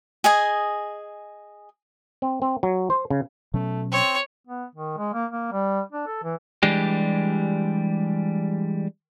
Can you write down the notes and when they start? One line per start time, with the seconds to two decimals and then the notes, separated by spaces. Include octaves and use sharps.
0.24 G#4 D#5 G#5
2.22 C4
2.42 C4
2.63 F#3
2.90 C5
3.10 C#3
3.54 B2 F#3 A3 C#4
3.92 C4 C#5
4.47 B3
4.75 D#3
4.98 G#3
5.14 A#3
5.32 A#3
5.52 G3
5.92 D4
6.07 A4
6.24 E3
6.63 E3 G3 G#3 D4 G4